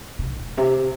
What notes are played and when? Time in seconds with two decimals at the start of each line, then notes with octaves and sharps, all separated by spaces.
0.19 C3
0.30 A2
0.57 C3